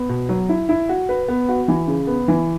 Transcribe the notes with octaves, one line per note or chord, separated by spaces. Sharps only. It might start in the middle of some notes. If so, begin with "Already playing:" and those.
Already playing: B3
B2
F#3
E4
E4
F#4
B4
B3
F#4
E3
C#3
B3
E3